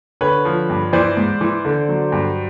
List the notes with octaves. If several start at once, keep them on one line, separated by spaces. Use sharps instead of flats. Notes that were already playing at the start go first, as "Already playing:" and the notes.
D3 B4 C#5
F3
G2
E3 C5 D5
G#2
E3
D3
F#3
G2